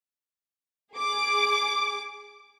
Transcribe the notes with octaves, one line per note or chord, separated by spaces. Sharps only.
G#4 D6